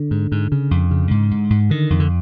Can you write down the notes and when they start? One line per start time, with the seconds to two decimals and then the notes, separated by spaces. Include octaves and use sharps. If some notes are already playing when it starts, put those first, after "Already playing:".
Already playing: D3
0.11 G#2
0.32 G#2
0.52 C#3
0.71 F2
0.91 C#3
1.11 G#2
1.31 G#2
1.50 G#2
1.70 D3 D#3
1.90 F2
2.00 D3